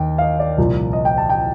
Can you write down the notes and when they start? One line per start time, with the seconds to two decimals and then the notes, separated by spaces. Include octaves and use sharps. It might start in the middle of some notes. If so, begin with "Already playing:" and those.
Already playing: D#2 D#3 G5
0.18 F5
0.22 D#5
0.39 D5
0.58 C2 A#2 F3
0.93 D#5
1.05 G5
1.18 A5
1.29 G5